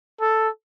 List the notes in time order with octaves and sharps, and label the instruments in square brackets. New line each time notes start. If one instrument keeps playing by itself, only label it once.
[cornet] A4